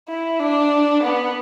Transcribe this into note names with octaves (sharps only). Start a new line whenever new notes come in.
E4
D4
B3